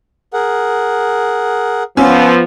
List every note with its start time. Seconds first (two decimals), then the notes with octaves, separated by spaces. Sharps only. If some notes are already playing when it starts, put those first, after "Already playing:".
0.33 G#4 A#4 F#5
1.97 F3 B3 C#4 C6 D6 E6